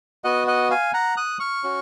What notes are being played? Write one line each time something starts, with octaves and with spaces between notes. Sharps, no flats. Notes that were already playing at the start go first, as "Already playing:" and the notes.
B3 F#4 D#5 F#5
D#5 F#5
F5 G#5
F#5 A#5
D#6 F#6
C#6 F6
C#4 F#4